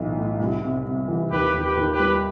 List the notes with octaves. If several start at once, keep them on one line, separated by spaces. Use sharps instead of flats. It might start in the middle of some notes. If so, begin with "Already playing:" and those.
Already playing: B1 A2 E3
A2
C2
C3
C3
E3
D#2 G4 B4
D#2
G4 B4
D#2
G4 B4
G3